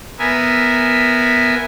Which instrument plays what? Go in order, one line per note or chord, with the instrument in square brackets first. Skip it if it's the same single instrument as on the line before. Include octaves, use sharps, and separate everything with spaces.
[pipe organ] B3 A#4 E5 G#5